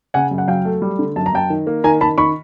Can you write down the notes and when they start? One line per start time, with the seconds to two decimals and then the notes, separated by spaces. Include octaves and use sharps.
0.14 C#3 F#5 G#5
0.31 F#2
0.38 F#5
0.48 F#3 F5 G5
0.65 A3
0.82 G3
0.99 D3
1.16 F#2 A5
1.26 A#5
1.33 F#2 G5 A5
1.50 D#3
1.67 A#3
1.84 D#3 G#5 A#5
2.01 D#3 A5 B5
2.18 D#3 B5 C#6